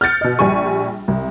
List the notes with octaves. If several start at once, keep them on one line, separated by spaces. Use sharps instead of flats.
F6 G6 A6 C#7
B2 D#5
A#1 G3 G#5 C#6
C2